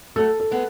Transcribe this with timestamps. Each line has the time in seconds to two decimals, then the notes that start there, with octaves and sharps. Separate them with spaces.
0.16 F#3 A3 A4
0.40 A4
0.51 G#3 B3